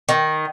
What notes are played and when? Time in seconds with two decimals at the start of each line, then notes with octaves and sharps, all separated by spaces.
0.09 D#3